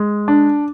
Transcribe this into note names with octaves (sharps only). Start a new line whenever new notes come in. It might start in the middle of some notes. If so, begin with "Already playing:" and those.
Already playing: G#3
D4